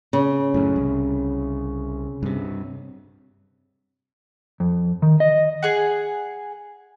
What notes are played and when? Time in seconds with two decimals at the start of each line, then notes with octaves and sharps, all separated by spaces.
0.13 C#3
0.54 F#2 A2
0.76 C2
2.23 G2 C3
4.60 F2
5.02 D#3
5.20 D#5
5.62 G#4 F#5